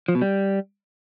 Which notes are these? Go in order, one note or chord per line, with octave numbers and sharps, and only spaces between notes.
F3
B2
G3